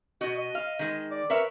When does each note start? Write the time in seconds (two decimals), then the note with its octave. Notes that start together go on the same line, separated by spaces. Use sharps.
0.21 B2 F#4 D#5
0.37 D#5
0.55 F5
0.79 D#3 G#3
1.11 D5
1.30 A#4 B4 C#5 E5